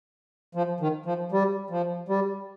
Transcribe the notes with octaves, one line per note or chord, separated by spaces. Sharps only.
F3
D#3
F3
G3
F3
G3